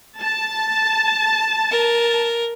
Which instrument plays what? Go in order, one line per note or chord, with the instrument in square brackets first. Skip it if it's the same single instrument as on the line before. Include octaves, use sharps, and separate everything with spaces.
[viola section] A5
[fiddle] A#4